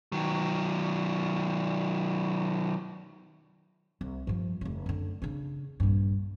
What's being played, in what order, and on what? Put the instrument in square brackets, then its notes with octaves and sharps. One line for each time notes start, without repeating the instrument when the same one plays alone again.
[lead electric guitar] D#3 F#3
[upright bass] C2
G2 F3
F1 C#3
F#2 D3
C#3 D4
A#1 G2